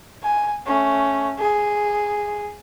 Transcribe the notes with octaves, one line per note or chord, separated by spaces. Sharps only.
G#5
A3 C#4
G#4